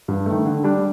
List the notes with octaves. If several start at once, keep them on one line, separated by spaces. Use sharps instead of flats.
G2
D#3 A3
D3
G3 D4